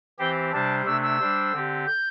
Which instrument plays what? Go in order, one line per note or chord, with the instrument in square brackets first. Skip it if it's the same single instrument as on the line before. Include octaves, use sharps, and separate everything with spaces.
[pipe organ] E3 C4 G4 C5 [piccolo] G5
[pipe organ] C3 G3 D4 C5 [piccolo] A5
[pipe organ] C3 A3 D4 [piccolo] E6
[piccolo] E6
[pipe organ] G3 D4 C5
D3 C4 G4
[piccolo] G6